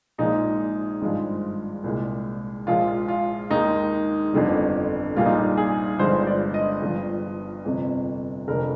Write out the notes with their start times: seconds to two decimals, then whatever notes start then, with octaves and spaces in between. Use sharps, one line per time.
0.18 A#1 A#2 F3 G#3 D#4
1.01 G#1 G2 F3 G#3
1.84 C2 A#2 G#3
2.67 A#1 A#2 F3 G#3 F4
3.08 F4
3.50 D#2 D#3 G#3 D#4
4.33 G1 F2 D3 G3
5.16 A#1 A#2 G3 F4
5.25 D#4
5.35 F4
5.57 G#4
5.99 G1 G2 D3 F3 G#3 C5
6.23 C5
6.27 D5
6.54 D#5
6.82 G1 G2 F3
7.65 G1 F2 C3
8.48 F1 F2 D3 A#4